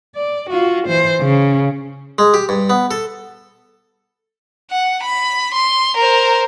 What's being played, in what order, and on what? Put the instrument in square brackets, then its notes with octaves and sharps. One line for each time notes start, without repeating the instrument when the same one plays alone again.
[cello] D5
F4 F#4
E3 C5
C#3
[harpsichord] G#3
G4
G2
B3
A4
[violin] F#5
B5
C6
A#4 C5